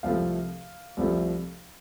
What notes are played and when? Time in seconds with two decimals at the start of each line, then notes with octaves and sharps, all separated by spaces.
0.03 C2 C3 F3 A3 F5
0.97 C2 C3 F3 A3